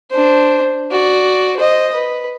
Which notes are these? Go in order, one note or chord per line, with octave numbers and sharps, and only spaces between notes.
D4 C5
F#4 D5
C5 D#5
B4